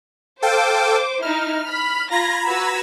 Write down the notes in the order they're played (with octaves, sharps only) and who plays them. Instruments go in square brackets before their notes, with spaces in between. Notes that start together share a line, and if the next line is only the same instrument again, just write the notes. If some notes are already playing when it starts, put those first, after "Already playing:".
[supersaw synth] A4 F5 G5 [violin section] C5 D6
[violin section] D#4 E4 [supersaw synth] F6
[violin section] B5
[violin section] F4 A#6 [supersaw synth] A#5 B5 G#6
[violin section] F#4 B4 E6